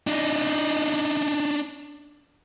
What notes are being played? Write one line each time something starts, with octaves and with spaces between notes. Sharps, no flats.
D4 D#4